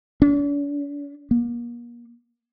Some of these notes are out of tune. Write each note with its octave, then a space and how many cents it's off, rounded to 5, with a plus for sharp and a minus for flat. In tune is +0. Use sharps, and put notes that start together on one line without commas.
D4 -45
A#3 +40